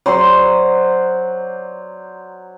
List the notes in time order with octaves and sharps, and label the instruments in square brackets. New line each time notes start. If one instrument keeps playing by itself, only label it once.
[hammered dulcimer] F#3 C5 D5 C6